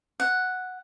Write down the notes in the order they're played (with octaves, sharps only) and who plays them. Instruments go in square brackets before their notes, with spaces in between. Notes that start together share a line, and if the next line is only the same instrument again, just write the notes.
[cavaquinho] F#5